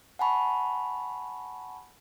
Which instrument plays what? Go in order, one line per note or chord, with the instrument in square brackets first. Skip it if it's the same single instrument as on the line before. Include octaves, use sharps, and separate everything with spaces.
[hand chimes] F#5 G#5 A5 B5 C#6